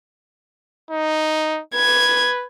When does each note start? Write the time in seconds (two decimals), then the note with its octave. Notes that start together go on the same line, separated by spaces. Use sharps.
0.91 D#4
1.75 B4 G#6